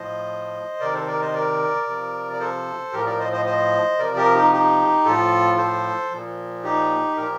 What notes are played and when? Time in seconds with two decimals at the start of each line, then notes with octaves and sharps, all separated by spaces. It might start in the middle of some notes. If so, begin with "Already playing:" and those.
Already playing: A2 F3 C5 D#5
0.80 C3 D#3 A#4 D5
0.94 A4 C5
1.07 A#4 D5
1.21 C5 D#5
1.33 A#4 D5
1.87 C3 F3
2.33 D5
2.40 A4 C5
2.92 A2 F3 G4 A#4
3.06 A#4 D5
3.19 C5 D#5
3.33 C5 D#5
3.46 C5 D#5
3.99 C3 F3 A#4 D5
4.16 G4 A#4
4.34 D#4 G4
4.52 D#4 G4
5.05 A2 F3 F4 A4
5.58 A4 C5
6.11 A#2 F3
6.64 D#4 G4
7.17 A#2 F3 G4 A#4